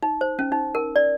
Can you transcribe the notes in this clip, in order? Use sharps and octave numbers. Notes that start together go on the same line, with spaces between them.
D#4
C5
C#4
D#4
A#4
D5